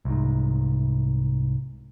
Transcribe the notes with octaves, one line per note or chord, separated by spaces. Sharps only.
C2 G#2